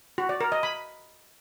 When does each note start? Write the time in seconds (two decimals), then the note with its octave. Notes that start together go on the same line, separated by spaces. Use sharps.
0.18 F#4
0.29 D5
0.41 A#4
0.52 D#5
0.63 B5